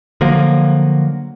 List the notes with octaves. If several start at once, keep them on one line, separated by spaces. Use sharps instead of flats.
D3 F3 F#3 A#3